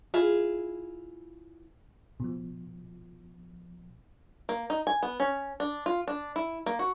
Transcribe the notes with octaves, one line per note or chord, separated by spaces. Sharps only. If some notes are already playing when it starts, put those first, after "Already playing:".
E4 F4 G#4
B2 F3
A#3
D#4
G#5
B3
C#4
D4
F4
D4
E4
A#3
F#4